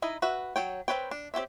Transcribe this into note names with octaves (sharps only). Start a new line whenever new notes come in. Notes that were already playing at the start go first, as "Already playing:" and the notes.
D#4 E4 D#5
F#4 B4 E5
F#3 C#5 G5
C4 F4 B4 C#5 G5
D4
C4 G4 C#5 E5